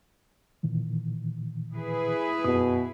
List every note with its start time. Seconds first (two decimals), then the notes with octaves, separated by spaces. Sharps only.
0.63 A#2 D#3 E3
1.74 E4 G#4 B4
2.44 F#2 B2 D#6